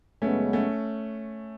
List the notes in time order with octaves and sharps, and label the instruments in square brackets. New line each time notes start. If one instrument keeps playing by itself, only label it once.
[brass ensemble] F#2 C#3 G#3 B3 [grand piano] A3 C#4
[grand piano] A3 C#4